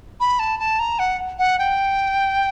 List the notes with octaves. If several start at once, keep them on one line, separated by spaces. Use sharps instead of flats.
B5
A5
A5
A#5
F#5
F#5
G5